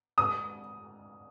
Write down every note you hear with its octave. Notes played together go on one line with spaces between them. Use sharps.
D#6